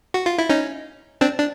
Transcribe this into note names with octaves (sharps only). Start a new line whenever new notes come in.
F#4
F4
E4
C#4 D#4
C4 D4
D4